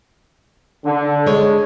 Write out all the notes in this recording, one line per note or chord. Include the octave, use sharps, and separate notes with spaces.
D3
G#3 C#5